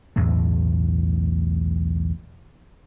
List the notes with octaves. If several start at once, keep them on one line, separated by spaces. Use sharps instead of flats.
B1 E2 A2 A3